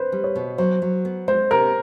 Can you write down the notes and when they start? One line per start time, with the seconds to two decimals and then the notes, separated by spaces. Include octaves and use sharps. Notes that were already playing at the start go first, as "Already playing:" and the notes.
Already playing: B4 C5
0.12 G3
0.24 C#5
0.36 B2
0.58 F#3 C5
0.82 F#3
1.05 B3
1.28 G#3 C5
1.51 C3 A#4